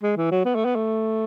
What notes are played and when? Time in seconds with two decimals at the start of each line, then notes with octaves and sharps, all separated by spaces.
0.02 G#3
0.17 E3
0.31 F#3
0.45 B3
0.55 A3
0.65 B3
0.76 A3